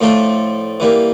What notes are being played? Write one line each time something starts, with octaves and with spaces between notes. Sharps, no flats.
A2 F3 A3 D4 F4
E3 G3 A#3